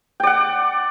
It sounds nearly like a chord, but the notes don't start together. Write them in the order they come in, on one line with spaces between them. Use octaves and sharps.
G5 D5 F#5